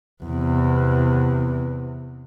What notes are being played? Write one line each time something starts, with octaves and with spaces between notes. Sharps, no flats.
E2 C3